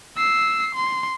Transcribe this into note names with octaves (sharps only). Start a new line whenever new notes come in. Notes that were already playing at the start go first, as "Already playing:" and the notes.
E6 C7
C6